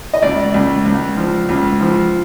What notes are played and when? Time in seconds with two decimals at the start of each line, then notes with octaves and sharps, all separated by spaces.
0.14 D#5
0.23 C#2 D5
0.54 C#2
0.86 C#2
1.17 F3
1.49 C#2
1.81 F3